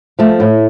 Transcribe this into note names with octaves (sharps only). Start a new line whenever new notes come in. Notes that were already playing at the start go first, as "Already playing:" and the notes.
F3 A3
A2